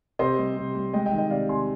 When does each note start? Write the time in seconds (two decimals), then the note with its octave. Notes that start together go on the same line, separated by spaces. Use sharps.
0.19 C3 C5 D#5
0.38 G3
0.57 C3
0.75 G3
0.94 G#3 D#5 G5
1.06 D#5 G5
1.12 D#3
1.18 D#5 G5
1.30 C3 D5 F5
1.49 C3 G#5 C6